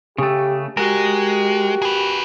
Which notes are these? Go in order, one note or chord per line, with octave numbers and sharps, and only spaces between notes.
C#3 A3 G4
G#3 F#4 G4 A#4
G#4 B4